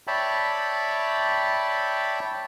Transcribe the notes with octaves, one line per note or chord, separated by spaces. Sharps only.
C#5 D5 E5 G5 A5 B5